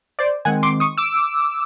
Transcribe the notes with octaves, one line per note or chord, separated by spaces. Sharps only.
C5 D5
D#3 G#3 C4 F#5 G#5
C6 D6
C#6 D#6
D6 E6